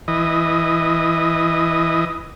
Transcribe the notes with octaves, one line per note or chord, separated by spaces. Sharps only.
E3 D#5